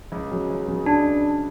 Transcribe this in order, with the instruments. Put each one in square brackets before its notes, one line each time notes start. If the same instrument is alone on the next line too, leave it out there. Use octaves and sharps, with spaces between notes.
[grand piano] C#2
C#3 F#3
C#2
C#3 F#3
[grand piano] C#2 [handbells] D4